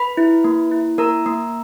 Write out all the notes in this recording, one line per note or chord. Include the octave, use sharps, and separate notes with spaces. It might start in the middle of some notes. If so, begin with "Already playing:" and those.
Already playing: B4 B5
E4
A#3
E4
A#3 A#4 A#5
A#3